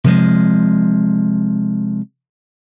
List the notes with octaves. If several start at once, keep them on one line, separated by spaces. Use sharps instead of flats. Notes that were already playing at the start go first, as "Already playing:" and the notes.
C3 F3 G#3